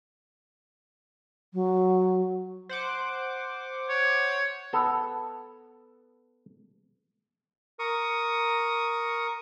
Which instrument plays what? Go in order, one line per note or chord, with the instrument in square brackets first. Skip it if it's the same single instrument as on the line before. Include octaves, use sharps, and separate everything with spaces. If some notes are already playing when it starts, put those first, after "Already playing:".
[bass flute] F#3
[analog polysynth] C5 F#5 D6
[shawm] C#5
[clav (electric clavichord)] B3 A4
[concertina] A#4 C#6 D#6